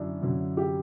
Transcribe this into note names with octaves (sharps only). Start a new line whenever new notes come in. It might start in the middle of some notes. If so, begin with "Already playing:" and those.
Already playing: F#2 D3 F#3 D4 E4
F#2 D3 F#3
G4